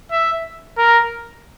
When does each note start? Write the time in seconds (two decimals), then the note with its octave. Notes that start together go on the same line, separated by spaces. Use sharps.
0.11 E5
0.78 A#4